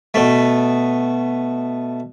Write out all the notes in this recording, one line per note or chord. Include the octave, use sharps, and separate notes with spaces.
B2 A3